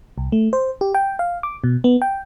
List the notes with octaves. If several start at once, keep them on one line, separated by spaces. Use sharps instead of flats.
C2
A3
C5
G4
G5
F5
D6
B2
B3
G5